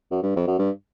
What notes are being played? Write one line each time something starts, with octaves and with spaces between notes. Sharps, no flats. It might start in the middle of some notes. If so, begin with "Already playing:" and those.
F#2
G2
F2
F#2
G2